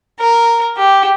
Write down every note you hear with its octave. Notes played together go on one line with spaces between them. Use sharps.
A#4
G4